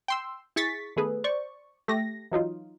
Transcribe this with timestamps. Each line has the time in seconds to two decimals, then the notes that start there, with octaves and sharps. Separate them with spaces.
0.08 G5 C6 E6
0.56 E4 G#4 C#6 A6 B6
0.96 D#3 A3 B3 G#4 A4 B4
1.24 C5 D5 C#6
1.88 A3 G4 A#6
2.32 E3 F#3 D#4 F4